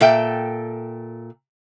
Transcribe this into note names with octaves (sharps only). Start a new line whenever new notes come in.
A#2 A4 E5 G5